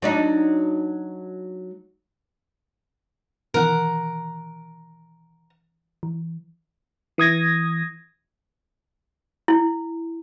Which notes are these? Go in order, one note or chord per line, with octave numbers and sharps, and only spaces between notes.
F#3 D4 D#4
B2 D#3 E3 A#4 F#5
E3
E3 D#6 G#6 A#6
E4